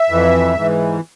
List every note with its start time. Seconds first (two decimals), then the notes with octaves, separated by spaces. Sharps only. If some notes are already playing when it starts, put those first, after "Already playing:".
Already playing: E5
0.10 F2 E3
0.55 G#2 E3